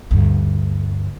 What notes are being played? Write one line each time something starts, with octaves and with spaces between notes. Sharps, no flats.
D2 G2